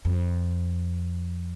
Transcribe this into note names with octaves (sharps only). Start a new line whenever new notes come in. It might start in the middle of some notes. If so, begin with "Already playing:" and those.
F2